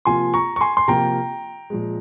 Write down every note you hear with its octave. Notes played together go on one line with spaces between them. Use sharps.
C3 F3 A#3 F4 G#5 C6
A#5 C#6
C#6
G#5 C6
C6
C3 F3 A#3 F4 G5 A#5
A#2 F3 G#3